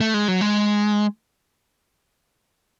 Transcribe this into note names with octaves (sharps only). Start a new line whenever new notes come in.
A3
G#3
F#3
G#3